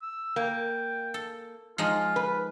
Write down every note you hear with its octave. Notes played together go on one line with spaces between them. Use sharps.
E6
A#3 G5
A4
F3 G#3 D#4 F4
B4